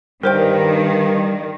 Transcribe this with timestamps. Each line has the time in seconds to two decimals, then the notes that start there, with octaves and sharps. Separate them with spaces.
0.23 G2 D#3 G3 G4 A#4 C5 G5